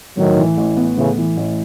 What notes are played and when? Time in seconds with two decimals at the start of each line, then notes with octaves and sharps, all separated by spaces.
0.17 A2 D#3 F#3
0.37 E3
0.57 A1
0.77 B3
0.97 A2 C#3 E3
1.17 E3
1.37 A1